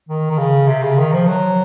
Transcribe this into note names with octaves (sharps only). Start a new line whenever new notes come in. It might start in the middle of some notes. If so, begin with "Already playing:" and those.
D#3
D#3
C#3
C3
C#3
D#3
F3
F#3